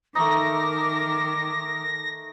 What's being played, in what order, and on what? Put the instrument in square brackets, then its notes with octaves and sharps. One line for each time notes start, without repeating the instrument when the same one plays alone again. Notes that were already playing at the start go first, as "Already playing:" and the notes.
[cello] D#3 A#4 [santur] A3 D#4 [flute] D6 [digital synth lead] A#6